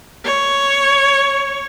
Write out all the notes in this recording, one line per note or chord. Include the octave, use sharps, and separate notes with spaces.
C#5